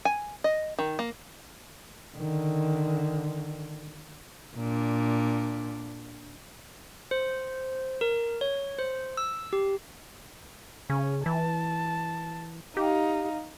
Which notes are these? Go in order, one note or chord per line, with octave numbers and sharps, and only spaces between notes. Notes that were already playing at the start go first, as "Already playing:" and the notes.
G#5
D#5
D#3
A#3
D3 D#3
A#2 D4
C5
A#4
C#5
C5
E6
G4
C#3 C#4
E3 A5
D#4 G4 F5